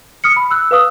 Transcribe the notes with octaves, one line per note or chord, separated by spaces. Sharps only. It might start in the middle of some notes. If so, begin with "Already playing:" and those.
D#6 F6 C#7
B5
E6 F#6
B4 F5 D#6